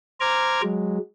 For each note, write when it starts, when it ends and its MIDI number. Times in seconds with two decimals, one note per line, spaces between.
0.20 0.62 72
0.20 0.62 82
0.20 0.62 86
0.20 0.62 89
0.20 0.62 92
0.63 0.98 54
0.63 0.98 56